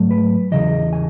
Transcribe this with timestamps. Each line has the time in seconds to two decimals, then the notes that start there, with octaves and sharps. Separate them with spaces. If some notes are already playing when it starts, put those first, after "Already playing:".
Already playing: G#2 F#3 A3
0.11 B4
0.52 E2 C#3 E3 D#5
0.93 G#5